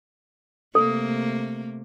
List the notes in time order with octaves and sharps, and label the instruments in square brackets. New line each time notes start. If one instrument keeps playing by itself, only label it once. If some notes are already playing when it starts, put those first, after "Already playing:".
[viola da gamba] C3 A3 A#3 [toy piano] A4